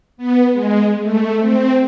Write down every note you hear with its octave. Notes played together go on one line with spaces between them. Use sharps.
B3
G#3
A3
C4